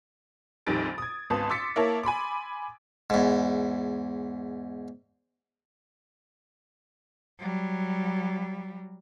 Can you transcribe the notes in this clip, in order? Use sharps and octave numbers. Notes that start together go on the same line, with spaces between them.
A#1 F2 D#3 G3 A6 D7
D#6 G#6
G#1 C#2 B3 A5 D#6
C6 D6 E6 A6 B6 C#7
A#3 E4 A#4 C#5 A5
G#5 B5 C6 D6
E2 G#2
F#3 G3